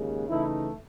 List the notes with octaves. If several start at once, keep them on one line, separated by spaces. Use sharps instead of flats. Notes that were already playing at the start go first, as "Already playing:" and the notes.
Already playing: D#2 C#3 G#3
C#3 E3 A3 D#4 E4